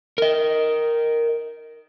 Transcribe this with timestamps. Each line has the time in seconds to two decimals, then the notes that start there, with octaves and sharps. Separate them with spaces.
0.18 A#4 D#5